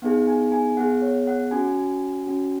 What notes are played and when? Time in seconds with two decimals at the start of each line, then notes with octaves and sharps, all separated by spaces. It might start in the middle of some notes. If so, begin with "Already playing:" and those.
0.02 B3 D#4 G#4 F#5
0.27 G#5
0.52 G#5
0.77 B3 G#4 F#5
1.02 C#5
1.27 F#5
1.51 C#4 F#4 G#5
2.26 C#4 F#4